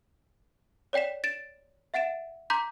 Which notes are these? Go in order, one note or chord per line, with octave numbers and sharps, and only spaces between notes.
C#5 D5 G5 B6 E7
A6 D7 E7
E5 F#5 A6 D7 E7
A#5 C6 D6 G6 B6